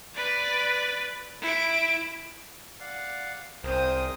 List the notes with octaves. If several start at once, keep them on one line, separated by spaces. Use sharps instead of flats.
B4 D5
E4 D7
D5 F5 F#5
C2 C4 G#4 A#4 C5 D#6